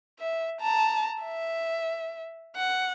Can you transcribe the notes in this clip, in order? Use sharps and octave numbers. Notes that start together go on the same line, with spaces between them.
E5
A5 A#5
E5
F#5